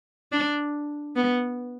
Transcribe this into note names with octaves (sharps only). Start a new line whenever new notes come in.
D4
B3